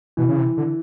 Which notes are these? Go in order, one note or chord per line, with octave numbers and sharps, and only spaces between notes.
B2 E3
C#3
C3
D3